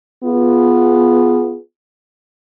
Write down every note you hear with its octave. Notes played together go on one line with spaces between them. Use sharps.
B3 F4 G#4